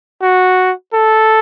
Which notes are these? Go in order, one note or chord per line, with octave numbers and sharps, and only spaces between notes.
F#4
A4